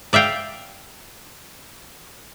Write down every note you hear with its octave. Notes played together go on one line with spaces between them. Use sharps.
D5 E5 F5 G5